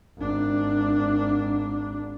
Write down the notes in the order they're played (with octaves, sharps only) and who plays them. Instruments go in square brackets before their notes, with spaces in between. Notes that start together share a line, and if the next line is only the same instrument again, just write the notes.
[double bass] G#1 D4